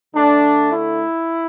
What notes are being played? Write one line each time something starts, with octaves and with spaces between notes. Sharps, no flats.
D3 A3 D4
E4